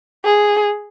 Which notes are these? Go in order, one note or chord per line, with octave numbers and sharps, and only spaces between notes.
G#4